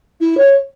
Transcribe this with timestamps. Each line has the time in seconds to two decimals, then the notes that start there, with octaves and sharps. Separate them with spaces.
0.21 E4
0.37 C#5